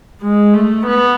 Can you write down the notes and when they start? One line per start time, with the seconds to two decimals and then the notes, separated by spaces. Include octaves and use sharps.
0.22 G#3
0.54 A3
0.86 B3